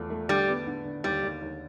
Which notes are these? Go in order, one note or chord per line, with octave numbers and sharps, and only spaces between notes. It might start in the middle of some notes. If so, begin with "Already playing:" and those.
Already playing: E2 F3 A3
A3
D3 G3
B3
D3
D3
D#2 G3
D#2
D#2